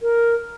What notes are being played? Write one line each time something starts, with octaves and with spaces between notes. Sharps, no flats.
A#4